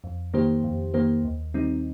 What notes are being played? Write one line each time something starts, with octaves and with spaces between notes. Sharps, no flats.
F2
D#3 A#3 G4 C5
F2
D#3 A#3 G4 C5
D#2
D#3 G3 C4 D#4